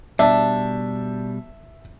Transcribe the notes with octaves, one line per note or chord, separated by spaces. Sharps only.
B2 G3 D4 E5